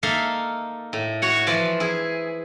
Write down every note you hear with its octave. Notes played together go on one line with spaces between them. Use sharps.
A#3 D#4 A4 E5 F5
A2
F#4 C#5 F#5
E3 F3 F4 D5 G#5 A5
E4 G#4